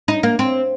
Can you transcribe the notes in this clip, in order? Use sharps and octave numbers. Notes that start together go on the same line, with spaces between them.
D#4
A#3
C4